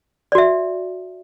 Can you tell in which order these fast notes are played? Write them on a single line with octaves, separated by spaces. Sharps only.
D5 F#4 E5